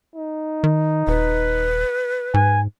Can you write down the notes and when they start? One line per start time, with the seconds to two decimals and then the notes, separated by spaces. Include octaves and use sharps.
0.16 D#4
0.64 D#3
1.07 D#1 B4
2.34 G#2 G#5